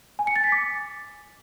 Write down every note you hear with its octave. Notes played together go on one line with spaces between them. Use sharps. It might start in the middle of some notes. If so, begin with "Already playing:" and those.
G#5
C#7
A6
B6
D6